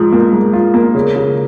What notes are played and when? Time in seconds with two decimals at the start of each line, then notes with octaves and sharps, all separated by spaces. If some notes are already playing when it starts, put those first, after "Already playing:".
Already playing: G#2 F3
0.12 A#3
0.33 G#2
0.53 F4
0.74 A#3
0.95 C#3
1.16 C#3